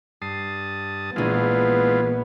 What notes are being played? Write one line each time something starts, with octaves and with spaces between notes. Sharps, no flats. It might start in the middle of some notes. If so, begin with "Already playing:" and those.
G2 A5 D#6 C7
A#1 E3 G#3 B3 F4 D#7